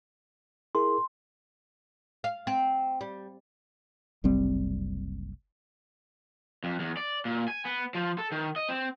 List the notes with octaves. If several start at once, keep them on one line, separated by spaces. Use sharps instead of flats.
E4 G#4 A#4 C6
F5
C4
G3
F#1 C2 G3 C4
F2
E2
D5
A#2
G#5
B3
F3
A4
D#3
D#5
C4